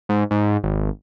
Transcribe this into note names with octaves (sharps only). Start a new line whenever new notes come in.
G#2
G#2
G#1